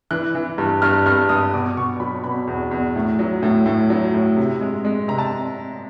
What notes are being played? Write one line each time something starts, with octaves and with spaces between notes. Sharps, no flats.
E3 F#6
E3
G2
G2 F6
G2 F6
G2 D#6
B2 D6
B2 C#6
F#3 B5
B2 B5
E2
E2
A2
F#3
A2
A2
F#3
A2
C3
G#3
G#3
C3 A#5
A5